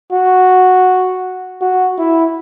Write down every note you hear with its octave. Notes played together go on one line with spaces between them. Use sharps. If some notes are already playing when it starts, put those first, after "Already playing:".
F#4
F#4
E4